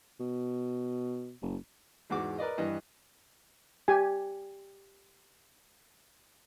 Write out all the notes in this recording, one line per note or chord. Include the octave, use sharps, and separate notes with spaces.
B2
F#1
E2 G#2 F#4 D6
A#4 B4 D5 D#5
G2 E3 D#5
G4 G#5